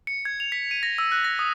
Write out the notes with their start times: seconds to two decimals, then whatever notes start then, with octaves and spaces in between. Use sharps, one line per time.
0.07 C#7
0.25 G#6
0.40 F7
0.52 B6
0.71 D#7
0.83 A#6
0.98 E6
1.12 F#6
1.24 A#6
1.39 D#6